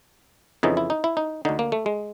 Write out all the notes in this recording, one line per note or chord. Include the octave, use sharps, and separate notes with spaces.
F2 C#3 E3 D#4
E4
D#4
E4
D#4
D2 D3 D#4
A#3
A3
G#3